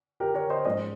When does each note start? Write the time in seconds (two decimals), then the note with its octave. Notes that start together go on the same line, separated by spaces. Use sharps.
0.20 G4 A#4
0.34 A#4 C#5
0.50 C5 D#5
0.65 G#2 F3 G#3 C#4 C5 D#5